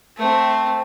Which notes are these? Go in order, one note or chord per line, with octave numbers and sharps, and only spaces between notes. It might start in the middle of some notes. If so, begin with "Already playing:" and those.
A3 C4